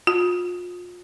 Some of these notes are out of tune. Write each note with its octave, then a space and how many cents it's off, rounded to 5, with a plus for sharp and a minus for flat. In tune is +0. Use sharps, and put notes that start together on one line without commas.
F4 +35